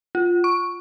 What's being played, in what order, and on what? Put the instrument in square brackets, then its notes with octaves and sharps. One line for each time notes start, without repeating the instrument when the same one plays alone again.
[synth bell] F4
C#6